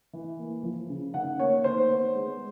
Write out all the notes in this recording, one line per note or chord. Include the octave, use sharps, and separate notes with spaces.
E3
A#3
F3
C#3
D#3 F#5
A#3 C#5
D#3 C5
B3
G#3